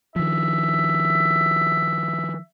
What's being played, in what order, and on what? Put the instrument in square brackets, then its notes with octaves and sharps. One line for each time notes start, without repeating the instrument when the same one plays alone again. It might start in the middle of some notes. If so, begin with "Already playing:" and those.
[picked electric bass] D#3 F3 [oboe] E5